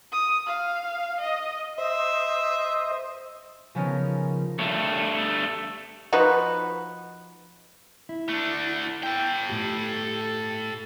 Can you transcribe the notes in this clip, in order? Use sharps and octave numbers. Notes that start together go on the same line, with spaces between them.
D#6
F5
D#5
C5 D#5 E5 E6
C#3 F3 B3 C#4 D#4 A#4
G2 A3
F3 D#4 F#4 B4
E4
A3 D4
A4 G5
A2 G4